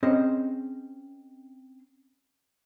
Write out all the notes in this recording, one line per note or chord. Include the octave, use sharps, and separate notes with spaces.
C4 C#4 G#4 C5 D#5